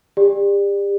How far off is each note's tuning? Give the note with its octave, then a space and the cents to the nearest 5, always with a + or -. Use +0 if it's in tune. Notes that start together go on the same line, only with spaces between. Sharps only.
G4 +35 D5 +15